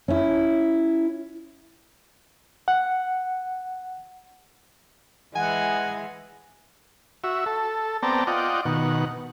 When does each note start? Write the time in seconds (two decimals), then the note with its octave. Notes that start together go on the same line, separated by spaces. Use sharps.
0.08 C#4 E4
2.68 F#5
5.35 E3 G#3 F#5 G#5
7.24 F#4 E5
7.46 A4
8.03 B3 C4 D5 G5 A5 A#5
8.27 F4 D5 D#5 F#5 G5
8.66 B2 D#3 F#5